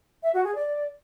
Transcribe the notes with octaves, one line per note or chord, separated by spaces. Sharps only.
E5
F#4
G#4
D5